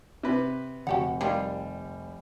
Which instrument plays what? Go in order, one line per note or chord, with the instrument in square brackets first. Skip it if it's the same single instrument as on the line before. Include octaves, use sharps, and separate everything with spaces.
[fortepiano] C3 B4
[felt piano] F1 [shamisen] F#4 G4 F#5
[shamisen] D#3 F4 [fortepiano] G3